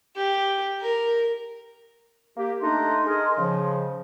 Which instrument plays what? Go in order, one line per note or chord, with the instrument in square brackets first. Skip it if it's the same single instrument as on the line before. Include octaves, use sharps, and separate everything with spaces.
[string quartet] G4
A#4
[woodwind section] A#3 G4
[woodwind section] A3 D4 D#4 [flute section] D#5 C6
[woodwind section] G#4 A#4
C#3 F3